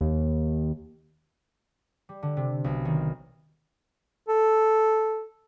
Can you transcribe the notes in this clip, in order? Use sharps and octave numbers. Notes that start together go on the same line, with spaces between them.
D#2
G3
D3
C3
B1
D#3
A4